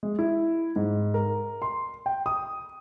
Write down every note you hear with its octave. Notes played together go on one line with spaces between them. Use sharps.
G#3
E4
G#2
A#4
C6
G5
D#6